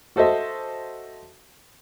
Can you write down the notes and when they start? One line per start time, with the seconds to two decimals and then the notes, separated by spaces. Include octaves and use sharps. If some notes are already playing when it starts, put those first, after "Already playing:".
0.16 F#4 A4 C5 D#5 E5